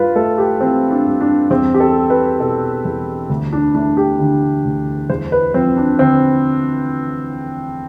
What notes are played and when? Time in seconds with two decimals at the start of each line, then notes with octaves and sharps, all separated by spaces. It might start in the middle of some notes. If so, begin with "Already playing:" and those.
Already playing: G2 F4 B4
0.16 A3 A4
0.38 G4
0.60 E3 C4
0.90 D4
1.06 G2
1.21 D4
1.50 E2 C4
1.74 G4
1.80 A4
1.95 G3
2.10 B4
2.40 B2 A4
2.85 E2
3.30 D2
3.53 D4
3.75 A3 D4
3.97 G4
4.19 D3
4.65 D2
5.10 E2 C5
5.32 B4
5.54 F3 C4
5.77 D4
5.99 D3 C4